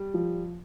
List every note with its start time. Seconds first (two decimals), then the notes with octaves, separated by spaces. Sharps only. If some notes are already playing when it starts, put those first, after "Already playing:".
Already playing: G3
0.14 F3